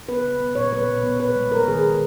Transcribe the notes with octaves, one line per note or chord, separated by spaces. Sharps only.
B3 B4
C#3
B3
A#2 C#5
A#3 B4
B2
B3
B3 B4
G#3
A#3 A#4
D#3 G#4
A#3